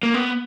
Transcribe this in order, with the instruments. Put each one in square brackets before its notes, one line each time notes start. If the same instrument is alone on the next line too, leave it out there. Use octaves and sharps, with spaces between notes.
[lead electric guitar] A#3
B3